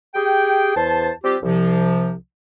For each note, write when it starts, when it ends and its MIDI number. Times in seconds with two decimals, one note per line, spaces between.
0.15 0.74 67
0.15 0.74 68
0.15 0.74 79
0.76 1.10 40
0.76 1.10 72
0.76 1.10 81
1.23 1.36 55
1.23 1.36 60
1.23 1.36 65
1.23 1.36 67
1.43 2.13 36
1.43 2.13 48
1.43 2.13 53